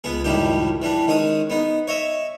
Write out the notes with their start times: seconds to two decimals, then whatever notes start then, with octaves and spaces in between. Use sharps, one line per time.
0.04 C#2 B3 G#4
0.24 C#2 F#2 A2 D#3 G3 G4
0.82 E3 G3 D4
1.07 D#3 G#3 C#4 D#6
1.50 B3 D#4
1.88 C#5 D#5 E5